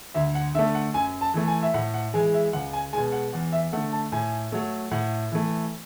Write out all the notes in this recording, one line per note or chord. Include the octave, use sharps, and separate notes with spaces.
D2 E5
F#5
D3 A3 E5
F#5
F#2 G#5
A5
E3 A3
G#5
E5
A2 F#5
F#5
E3 G#3 G#5
E5
C#2 F#5
G#5
B2 G#3 G#5
F#5
E2 F#5
E5
D3 A3 F#5
A5
A2 G#5
F#3 A3
A2 F#5
E3 A3